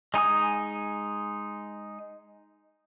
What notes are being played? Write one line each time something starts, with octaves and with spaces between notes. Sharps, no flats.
G#3 D#4 G#5 D#6